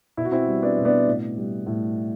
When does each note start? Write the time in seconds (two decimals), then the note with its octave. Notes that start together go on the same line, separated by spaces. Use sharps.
0.17 B2 E4
0.25 F#4
0.32 C4 E4
0.47 G3
0.63 B3 D4
0.78 B2
0.85 B3 D4
1.07 A2
1.37 G3
1.67 A2